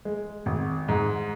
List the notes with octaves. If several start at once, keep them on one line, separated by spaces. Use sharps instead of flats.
G#3
G#1
G#2